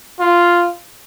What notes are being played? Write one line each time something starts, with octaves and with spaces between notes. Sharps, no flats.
F4